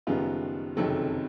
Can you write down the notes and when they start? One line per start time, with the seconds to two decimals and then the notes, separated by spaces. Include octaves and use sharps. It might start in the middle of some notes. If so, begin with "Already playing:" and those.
0.07 F#1 F#2 D#3 G3 B3 F4
0.77 F#1 F2 C3 D#3 F#3 A4